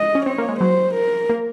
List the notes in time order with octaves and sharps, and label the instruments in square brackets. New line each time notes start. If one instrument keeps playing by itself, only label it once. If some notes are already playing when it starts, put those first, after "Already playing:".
Already playing: [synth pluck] G#3 [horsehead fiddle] D#5
[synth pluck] C#4
[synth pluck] C4 [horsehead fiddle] C#5
[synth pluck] A#3
G#3
[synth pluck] F#3 [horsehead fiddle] C5
[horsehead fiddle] A#4
[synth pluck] A#3